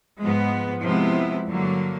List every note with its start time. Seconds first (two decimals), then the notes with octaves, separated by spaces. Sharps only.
0.19 G#2 F3 G#3 B3
0.82 C3 F3 G#3 B3 E4
1.46 G2 D3 F#3 A#3